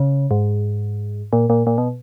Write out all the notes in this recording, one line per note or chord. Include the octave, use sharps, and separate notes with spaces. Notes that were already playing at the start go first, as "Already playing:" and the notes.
Already playing: C#3
G#2
A#2
A#2
A#2
B2